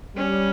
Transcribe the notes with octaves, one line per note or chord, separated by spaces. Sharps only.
G3 C#4